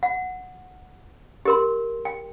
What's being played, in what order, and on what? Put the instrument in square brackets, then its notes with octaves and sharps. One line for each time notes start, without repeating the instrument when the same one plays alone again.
[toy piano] F#5
G4 A#4 C6
G5